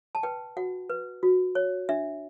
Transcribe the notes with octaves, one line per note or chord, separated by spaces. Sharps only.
A5
B4 G5
F#4 F#5
B4
F#4
C#5
D4 E5